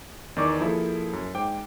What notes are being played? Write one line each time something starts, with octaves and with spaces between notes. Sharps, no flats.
E2 D#3 D5 C#6 D6
F3 A#3 E4 G#4 A4 C5
F#2
G#2 C5 G5 D6